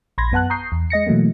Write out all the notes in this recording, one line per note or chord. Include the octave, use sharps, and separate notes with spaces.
A#1 B5 C6 G#6 A#6
F#2 B3 F#5 A5 F#6
A#5 C#6 D#6 G6 C7
E2
G#3 D#5 A#6 C#7
B2 E3 F#3 A3 A#3